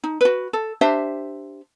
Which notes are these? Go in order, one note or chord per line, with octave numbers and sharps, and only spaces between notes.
D#4
F#4 B4
A4
D4 G4 C5 E5